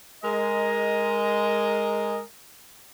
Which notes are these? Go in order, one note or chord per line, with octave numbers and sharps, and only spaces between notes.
G#3 A#4 D#5